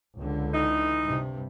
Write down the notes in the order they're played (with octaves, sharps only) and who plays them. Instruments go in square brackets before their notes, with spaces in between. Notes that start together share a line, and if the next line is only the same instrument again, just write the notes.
[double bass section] C#2 D3
[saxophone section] E3 D#4
[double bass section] G2 C3